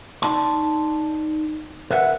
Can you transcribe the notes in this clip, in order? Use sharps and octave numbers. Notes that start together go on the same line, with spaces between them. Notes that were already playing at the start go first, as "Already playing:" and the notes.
D#4 D5 A5 C6
A#4 B4 E5 F#5